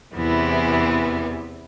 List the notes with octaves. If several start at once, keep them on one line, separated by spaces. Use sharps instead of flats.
E2 C3 E3 B3 E4